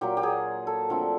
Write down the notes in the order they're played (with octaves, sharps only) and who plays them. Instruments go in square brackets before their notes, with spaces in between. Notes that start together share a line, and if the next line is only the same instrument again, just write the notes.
[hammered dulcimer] A#2 F#3 A#3 G4
G4
G#4
A4
D3 F3 A3 C4